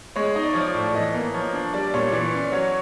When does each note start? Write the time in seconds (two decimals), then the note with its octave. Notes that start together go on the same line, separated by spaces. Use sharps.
0.16 G#3 C#5
0.35 D#4 D#5
0.43 D5
0.53 F3 C#5
0.61 D5
0.75 A2
0.94 E3 D#5
1.14 A#3
1.34 F3 C#5
1.53 D4
1.74 G3 D5
1.94 A#2 C#5
2.12 E3 D5
2.32 C#4
2.52 F#3 C#5